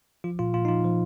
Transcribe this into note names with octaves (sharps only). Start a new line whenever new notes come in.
F3 F4
A#2 F4
A#2 F4
D#4
F3 F4
F3